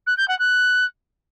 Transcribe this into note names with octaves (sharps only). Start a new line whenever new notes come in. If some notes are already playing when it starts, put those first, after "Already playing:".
F#6
G6
F#5
F#6